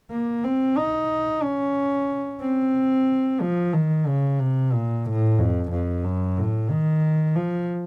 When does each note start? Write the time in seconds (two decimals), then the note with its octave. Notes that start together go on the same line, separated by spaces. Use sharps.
0.11 A#3
0.44 C4
0.77 D#4
1.43 C#4
2.41 C4
3.41 F3
3.73 D#3
4.07 C#3
4.39 C3
4.73 A#2
5.06 A2
5.38 F2
5.71 F2
6.04 F#2
6.37 A2
6.70 D#3
7.35 F3